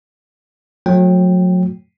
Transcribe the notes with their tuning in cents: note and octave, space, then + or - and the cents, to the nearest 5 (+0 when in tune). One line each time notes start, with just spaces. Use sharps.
F#3 -30 A3 +0 G5 +0